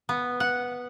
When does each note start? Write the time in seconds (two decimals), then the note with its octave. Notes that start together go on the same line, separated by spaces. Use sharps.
0.09 B3
0.40 F#5